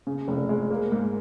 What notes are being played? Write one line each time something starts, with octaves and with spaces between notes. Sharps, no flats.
C#3
F1
G#3
A#3
G#2